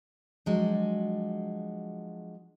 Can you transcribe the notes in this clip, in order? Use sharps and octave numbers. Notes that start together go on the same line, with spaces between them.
F3 F#3 G#3 D4 F#4